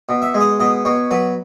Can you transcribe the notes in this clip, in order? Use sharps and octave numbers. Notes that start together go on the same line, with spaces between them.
B2
E5
G#3
D#5
B2 D#5
B2 C#5
F#3 B4